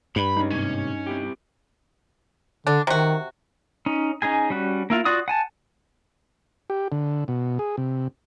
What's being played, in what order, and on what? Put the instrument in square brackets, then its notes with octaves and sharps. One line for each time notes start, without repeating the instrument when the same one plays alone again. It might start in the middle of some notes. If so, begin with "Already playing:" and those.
[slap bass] G2 [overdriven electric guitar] B5
[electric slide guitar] G#3 C#4 [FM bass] D#4
[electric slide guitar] G#2 C3 [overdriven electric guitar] C#4
[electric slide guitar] C4 E4 G4
[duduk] D3 [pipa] D4
[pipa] C3 F#4 [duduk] D#3
[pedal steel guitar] C#4 D#4
C#4 D#4 G#4 G#5
G3 C#4 F#4
A#3 E4 F4
F4 F#4 D5 D#6
F#5 G#5 A5
[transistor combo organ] G4
D3
B2
G#4
C3